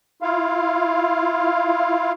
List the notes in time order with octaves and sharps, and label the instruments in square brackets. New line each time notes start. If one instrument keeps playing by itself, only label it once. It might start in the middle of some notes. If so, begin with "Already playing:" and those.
[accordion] E4 F4 F5